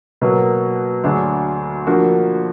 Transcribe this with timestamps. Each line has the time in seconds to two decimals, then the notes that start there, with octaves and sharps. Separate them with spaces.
0.21 B2 F#3 A#3
1.04 D2 D3 F#3 D4 G#4
1.87 D3 F3 A#3 D4 F#4